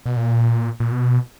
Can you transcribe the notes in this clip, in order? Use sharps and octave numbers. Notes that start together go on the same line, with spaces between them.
B2
A#2
A#2
B2